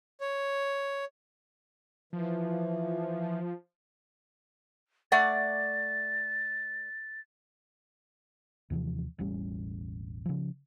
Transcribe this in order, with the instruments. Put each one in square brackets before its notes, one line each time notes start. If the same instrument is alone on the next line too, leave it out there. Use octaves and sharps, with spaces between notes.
[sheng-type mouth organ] C#5
[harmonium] E3 [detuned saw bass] F3
[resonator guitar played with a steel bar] A3 D5 F#5 [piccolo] A6
[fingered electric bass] D#2 C3 E3 F3
E1 A1 G3 C#4
C#3 F3